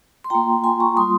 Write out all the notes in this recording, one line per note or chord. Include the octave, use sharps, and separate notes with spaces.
C6
A#3 F4 G5 A#5
A#3 F4 G#5 C6
A#5 C#6
G3 A#3 F4 C6 D#6